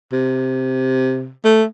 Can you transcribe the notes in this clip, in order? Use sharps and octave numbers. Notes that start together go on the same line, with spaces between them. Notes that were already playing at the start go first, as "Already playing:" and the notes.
C3
A3